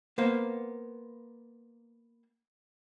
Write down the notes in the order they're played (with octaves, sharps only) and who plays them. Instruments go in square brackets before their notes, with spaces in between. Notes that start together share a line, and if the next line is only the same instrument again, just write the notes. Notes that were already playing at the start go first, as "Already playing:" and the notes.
[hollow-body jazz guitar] A#3 B3 C5 F5